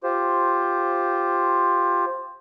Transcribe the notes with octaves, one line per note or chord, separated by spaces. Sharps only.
F4 G4 C5